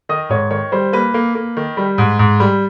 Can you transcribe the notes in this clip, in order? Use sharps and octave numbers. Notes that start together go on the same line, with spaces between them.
D#3 D#5
G#2 C#5
D#3 C#5
G3 C5
A#3 B4
A#3
A#3
D#3
G3
G#2
G#2
G3